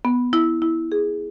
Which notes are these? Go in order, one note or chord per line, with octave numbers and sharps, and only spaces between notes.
B3
E4
E4
G#4